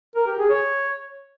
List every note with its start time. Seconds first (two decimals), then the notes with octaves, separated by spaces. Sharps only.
0.16 A#4
0.27 G4
0.39 G#4
0.50 C#5